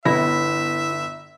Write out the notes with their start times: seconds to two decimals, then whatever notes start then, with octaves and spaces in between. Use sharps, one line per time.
0.05 G1 B3 E4 E5 A#6